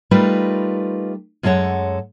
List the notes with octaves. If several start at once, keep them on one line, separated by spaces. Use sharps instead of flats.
G3 A3 D#4 F4 A#4 B4
F#2 G#3 F4 A4 C#5 F#5